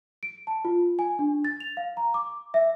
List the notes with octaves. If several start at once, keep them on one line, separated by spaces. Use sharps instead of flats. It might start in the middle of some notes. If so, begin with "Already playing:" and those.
D7
A5
F4
G#5
D4
A6
F7
F5
A#5
D6
E5